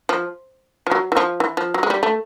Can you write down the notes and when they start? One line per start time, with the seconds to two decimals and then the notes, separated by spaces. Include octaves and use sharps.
0.09 F3
0.87 F3
0.91 F#3
1.12 E3
1.17 F3
1.40 E3
1.57 F3
1.74 F#3
1.83 G#3
1.90 G3
2.03 A3